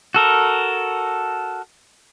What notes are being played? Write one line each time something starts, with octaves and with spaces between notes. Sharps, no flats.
F#4 A4 A#4